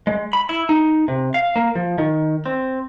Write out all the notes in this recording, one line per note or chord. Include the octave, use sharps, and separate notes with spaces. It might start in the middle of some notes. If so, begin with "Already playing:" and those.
G#3
B5
E4
D#4
C3
F5
A#3
F3
D#3
C4